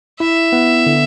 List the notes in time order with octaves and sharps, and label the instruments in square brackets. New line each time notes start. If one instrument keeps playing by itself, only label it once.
[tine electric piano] E4 [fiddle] E5
[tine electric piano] B3
D3